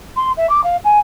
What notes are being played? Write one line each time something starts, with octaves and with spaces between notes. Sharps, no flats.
C6
E5
D6
F5
G#5